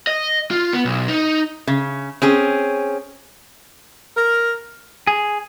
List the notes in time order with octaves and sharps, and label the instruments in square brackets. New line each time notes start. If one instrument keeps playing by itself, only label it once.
[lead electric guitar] D#5
F4
B3
B1
D#4
[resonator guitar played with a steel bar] C#3
C4 C#4 G#4
[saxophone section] A#4
[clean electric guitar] G#4